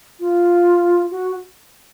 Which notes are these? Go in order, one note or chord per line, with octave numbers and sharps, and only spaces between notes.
F4
F#4